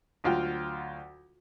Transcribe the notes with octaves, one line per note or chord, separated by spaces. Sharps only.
D2 F#3 F4 F#4 G5 F6